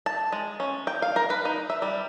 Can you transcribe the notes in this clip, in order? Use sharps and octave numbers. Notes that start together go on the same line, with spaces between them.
A5
G#3
C#4
G5
F5
A#4
B4
D#4
E5
G3